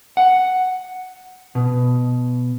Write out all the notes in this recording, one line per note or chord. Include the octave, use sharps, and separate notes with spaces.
F#5
B2